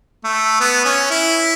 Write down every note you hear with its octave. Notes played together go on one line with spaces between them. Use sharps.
A3
B3
C#4
E4